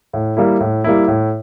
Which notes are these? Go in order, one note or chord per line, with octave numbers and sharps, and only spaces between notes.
A2
G3 A#3 E4
A2
G3 A#3 E4
A2